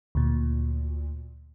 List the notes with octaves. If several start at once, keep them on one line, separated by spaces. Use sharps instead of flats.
D2 A#2